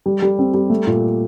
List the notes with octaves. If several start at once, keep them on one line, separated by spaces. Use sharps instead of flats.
G3
G3
C4
G3
A3
A#2